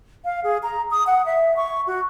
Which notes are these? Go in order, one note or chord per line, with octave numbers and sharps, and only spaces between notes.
F5
G#4
A#5
D#6
F#5
E5
C#6
F#4